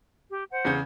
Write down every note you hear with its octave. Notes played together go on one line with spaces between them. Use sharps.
G4
C5 F#5
E2 C#3 G6